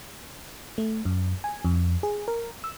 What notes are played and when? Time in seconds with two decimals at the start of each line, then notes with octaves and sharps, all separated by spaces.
0.78 A3
1.05 F#2
1.44 G#5
1.65 F2
2.03 G#4
2.28 A#4
2.64 E6